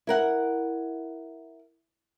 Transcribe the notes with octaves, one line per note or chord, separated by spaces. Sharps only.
E4 A#4 F#5